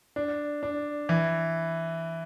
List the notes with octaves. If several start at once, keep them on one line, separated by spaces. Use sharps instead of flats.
D4
D4
E3